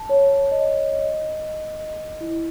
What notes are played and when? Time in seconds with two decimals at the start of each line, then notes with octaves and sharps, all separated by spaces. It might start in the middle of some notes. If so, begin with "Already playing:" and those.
Already playing: A5
0.09 C#5
0.51 D#5
0.93 D#5
1.37 D#5
1.79 D#5
2.20 E4